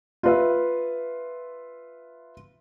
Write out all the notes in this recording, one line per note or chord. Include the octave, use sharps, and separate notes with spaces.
F4 B4 E5